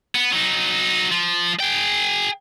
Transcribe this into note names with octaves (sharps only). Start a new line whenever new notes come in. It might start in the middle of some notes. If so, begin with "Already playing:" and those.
B3
F#3 D#4
F3
G#4 G5